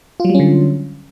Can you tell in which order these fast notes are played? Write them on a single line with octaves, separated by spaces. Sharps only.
F4 F#3 G3 C#4 D3